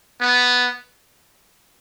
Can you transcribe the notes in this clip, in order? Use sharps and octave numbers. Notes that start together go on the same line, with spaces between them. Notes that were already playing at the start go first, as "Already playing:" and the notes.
B3